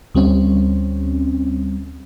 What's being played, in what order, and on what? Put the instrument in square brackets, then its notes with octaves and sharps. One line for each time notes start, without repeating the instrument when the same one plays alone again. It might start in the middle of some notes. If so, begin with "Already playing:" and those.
[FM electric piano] D2 G3 C4 C#4